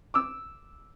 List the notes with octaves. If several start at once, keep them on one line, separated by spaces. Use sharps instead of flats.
D6 E6